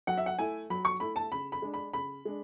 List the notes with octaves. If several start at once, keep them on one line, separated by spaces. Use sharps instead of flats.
F#3 F#5
E5
F#5
A3 E4 G#5
F#3 B5
C#6
A3 E4 B5
A5
C#3 B5
B5
G#3 D4
B5
C#3 B5
G#3 D4